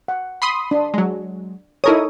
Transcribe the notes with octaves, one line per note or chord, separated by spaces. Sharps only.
F#5
B5 C6 D#6
D4
F#3 G#3
D#4 E4 A4 A#4 C#5 D#6